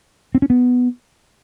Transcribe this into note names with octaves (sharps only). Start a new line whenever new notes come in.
C4
C#4
B3